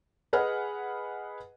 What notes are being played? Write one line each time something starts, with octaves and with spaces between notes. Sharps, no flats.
G#4 B4 D#5 F#5 G#5 F6